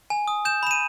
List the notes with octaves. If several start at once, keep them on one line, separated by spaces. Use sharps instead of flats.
G#5
D#6
G6 E7
B5 E7
D#7